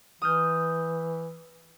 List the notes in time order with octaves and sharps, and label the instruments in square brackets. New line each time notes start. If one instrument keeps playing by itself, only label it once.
[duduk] E3 [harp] D#6 F6 G6